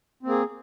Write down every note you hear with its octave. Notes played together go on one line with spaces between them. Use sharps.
A#3 C4 G#4